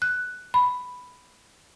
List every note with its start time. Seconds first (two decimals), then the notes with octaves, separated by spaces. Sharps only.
0.02 F#6
0.54 B5